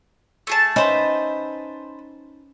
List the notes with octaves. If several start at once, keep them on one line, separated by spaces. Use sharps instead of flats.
A3 G#4 A5
C#4 D#4 B4 C5 E5 A5